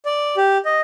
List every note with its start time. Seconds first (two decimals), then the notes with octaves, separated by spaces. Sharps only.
0.06 D5
0.37 G4
0.65 D#5